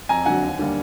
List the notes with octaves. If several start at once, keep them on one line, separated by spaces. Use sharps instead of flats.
F2 G#5 A#5
D3 F#3 F#5 G#5
D#2
D3 G3 A#3